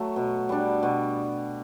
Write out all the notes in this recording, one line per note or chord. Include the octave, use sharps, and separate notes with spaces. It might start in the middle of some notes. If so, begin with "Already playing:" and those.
Already playing: F#3 A3
B2
G3 D4
B2